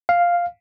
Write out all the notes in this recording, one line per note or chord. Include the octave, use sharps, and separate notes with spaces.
F5